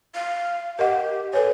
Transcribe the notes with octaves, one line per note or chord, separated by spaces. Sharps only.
F5
G4 A#4 D#5 F#5
A4 B4 C#5 G#5